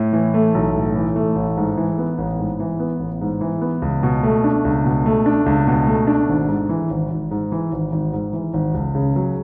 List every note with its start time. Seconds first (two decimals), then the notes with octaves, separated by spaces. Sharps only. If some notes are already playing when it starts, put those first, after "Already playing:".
Already playing: A2
0.13 E3
0.34 A3
0.55 B1
0.75 A2
0.95 E3
1.16 A3
1.36 A1
1.57 G#2
1.77 E3
1.98 B3
2.18 A1
2.39 G#2
2.60 E3
2.80 B3
3.00 A1
3.21 G#2
3.41 E3
3.61 B3
3.82 C#2
4.03 B2
4.23 A3
4.44 D4
4.65 C#2
4.85 B2
5.06 A3
5.26 D4
5.46 C#2
5.67 B2
5.87 A3
6.07 D4
6.29 G#1
6.49 G#2
6.69 E3
6.90 G#1
7.10 G#1
7.31 G#2
7.52 E3
7.73 G#1
7.92 G#1
8.13 G#2
8.33 E3
8.54 G#1
8.74 C#2
8.95 C#3
9.16 F#3